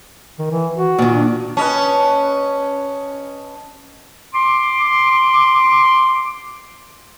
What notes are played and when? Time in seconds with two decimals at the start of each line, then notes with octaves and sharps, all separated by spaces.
0.39 D#3
0.51 E3
0.76 F#4
0.99 A#2 D#3
1.14 D4
1.57 C#4 B4 D#5 A5
4.35 C6 D6